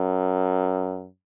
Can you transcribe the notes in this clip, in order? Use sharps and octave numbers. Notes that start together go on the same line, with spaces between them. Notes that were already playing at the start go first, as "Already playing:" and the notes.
Already playing: F#2